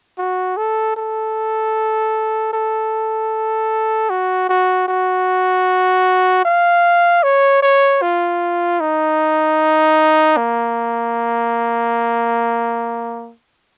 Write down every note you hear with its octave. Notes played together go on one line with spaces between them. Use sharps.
F#4
A4
A4
A4
F#4
F#4
F#4
F5
C#5
C#5
F4
D#4
A#3